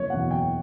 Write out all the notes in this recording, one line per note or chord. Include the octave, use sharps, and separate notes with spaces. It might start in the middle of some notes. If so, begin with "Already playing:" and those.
Already playing: F#1 C#5
E2 B2 F#3 F#5
F#1 G5